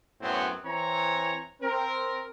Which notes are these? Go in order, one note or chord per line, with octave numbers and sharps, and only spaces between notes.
F#2 A2 F#3 B3 C4
E3 C4 C#5 A#5
C4 A#4